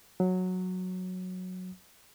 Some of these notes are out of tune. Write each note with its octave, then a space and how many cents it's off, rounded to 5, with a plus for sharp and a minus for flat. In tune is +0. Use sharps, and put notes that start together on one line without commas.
F#3 -10